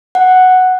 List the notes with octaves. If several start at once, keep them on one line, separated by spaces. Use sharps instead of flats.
F#5